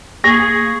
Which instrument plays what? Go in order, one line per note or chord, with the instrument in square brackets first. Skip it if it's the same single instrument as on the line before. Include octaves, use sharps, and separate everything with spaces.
[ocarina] A#3 [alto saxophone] G#4 [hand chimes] C#6 G#6 [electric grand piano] A#6